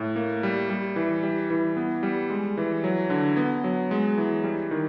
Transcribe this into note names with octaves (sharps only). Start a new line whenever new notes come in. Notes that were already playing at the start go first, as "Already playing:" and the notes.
Already playing: A2
A#3
G3
G3
E3
G3
E3
B3
G3
G#3
E3
F#3
D3
B3
F#3
G#3
E3
G3
D#3